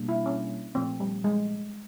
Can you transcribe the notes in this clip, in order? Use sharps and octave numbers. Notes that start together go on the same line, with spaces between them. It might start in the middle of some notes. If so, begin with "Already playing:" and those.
Already playing: B2 G3 A#3 D4
E4
C#4
A#2 F3 A3 C4
G3
G#3